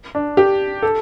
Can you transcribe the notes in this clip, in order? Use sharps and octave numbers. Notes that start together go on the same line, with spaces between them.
D4
G4
A4